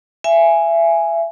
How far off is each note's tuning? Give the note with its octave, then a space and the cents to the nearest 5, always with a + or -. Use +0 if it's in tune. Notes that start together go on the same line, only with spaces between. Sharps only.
E5 +25 G#5 +0